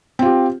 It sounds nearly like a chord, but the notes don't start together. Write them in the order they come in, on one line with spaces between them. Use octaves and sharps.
C4 F4 G4